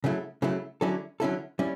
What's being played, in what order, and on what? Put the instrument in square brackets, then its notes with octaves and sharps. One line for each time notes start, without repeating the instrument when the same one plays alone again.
[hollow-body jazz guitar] C#3 F#3 A3 E4
C#3 F#3 A3 E4
D3 F#3 C#4 E4 A4
D3 F#3 C#4 E4 A4
G3 C#4 E4